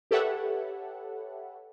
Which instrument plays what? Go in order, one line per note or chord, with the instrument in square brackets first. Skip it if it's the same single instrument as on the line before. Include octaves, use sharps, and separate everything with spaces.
[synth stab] G4 A4 B4 C#5 E5 F#5